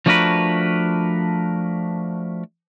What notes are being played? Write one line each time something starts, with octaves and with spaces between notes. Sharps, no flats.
F3 A3 D4 F#4 A#4 B4